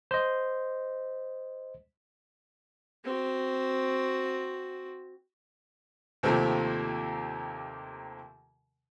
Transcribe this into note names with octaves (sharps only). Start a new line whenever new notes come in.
C5 D#5
C4 F#4
D#2 C3 D#3 F3 A3 A#3